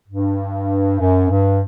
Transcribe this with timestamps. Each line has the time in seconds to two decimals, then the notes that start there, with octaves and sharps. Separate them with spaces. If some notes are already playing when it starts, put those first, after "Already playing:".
0.08 G2
0.99 F#2
1.29 G2